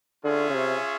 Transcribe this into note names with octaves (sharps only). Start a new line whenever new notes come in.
D3 C#4 F4 G#4 C#5 E5
C#3
C3